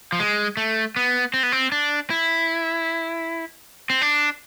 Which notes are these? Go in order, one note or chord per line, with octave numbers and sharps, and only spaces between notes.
F3
G#3
A3
B3
C4
B3
C4
D4
E4
C4
D4